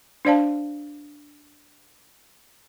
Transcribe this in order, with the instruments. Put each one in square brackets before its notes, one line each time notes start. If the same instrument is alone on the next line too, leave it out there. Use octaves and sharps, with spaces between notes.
[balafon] D4 C5 D5 F5 A5